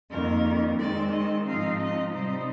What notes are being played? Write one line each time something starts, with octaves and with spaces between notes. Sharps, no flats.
F2 D#3 A#3 A#4
D#3 G#3 C4 D5
D#5
G#2 F3 C4 D#4 F5
D#5
C3 G3 C4 D#4 C5